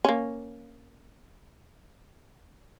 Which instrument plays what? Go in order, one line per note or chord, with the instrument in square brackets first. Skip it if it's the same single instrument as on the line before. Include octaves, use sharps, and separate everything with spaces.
[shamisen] A#3 C#4